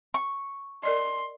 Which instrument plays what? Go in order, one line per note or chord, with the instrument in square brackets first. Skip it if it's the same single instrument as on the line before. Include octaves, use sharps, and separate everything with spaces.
[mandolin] C#6
[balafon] A#4 D5 D#5 [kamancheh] C6